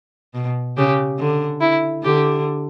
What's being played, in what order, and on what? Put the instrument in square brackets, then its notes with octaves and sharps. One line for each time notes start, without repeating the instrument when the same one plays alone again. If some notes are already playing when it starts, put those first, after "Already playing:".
[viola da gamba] B2
[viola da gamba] C#3 [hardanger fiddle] G4
[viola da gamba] D3
[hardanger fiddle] E4
[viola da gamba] D3 [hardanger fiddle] G4